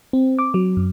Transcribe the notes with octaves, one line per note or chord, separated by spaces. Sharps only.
C4
D6
F#3
F#2